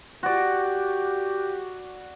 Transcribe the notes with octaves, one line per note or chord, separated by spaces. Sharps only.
F#4 G4 D5